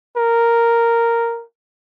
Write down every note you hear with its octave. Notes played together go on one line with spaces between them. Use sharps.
A#4